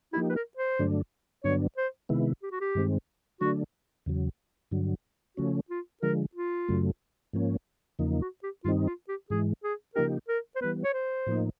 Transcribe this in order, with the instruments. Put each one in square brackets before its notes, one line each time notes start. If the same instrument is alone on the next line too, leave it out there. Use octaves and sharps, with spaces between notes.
[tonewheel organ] F3 A#3 D#4 G4 [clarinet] E4
[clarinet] B4
A#4
C5
[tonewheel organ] G2 D3 F#3 A3 D4
[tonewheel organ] G2 D3 F#3 B3 D4 [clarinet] C#5
[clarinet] C5
[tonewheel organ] C3 D#3 G#3 B3 E4
[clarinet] G4
F#4
G4
[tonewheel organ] G2 D#3 G#3 C4
[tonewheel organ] D3 F#3 A3 D4 [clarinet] F#4
[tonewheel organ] E2 C#3 F#3
G2 D3 F#3
[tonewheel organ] C#3 F3 A3 C#4 [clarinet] F#4
[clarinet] F4
[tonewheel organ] D3 F3 G#3 [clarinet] A#4
[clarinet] F4
[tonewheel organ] F#2 C#3 F#3 A3
G#2 F3 A#3 C#4
E2 C#3 F3 A#3 D#4
[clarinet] F#4
G4
[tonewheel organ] G2 D#3 G3 C4 D#4 [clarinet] F4
[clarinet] F4
G4
[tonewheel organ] G#2 E3 G#3 [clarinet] G#4
[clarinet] G#4
[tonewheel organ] C#3 F3 A#3 D#4 G4 [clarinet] A#4
[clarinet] A#4
C5
[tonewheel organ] E3 G3 B3 [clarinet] B4
[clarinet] C#5
C5
[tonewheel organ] A2 F3 A#3 D#4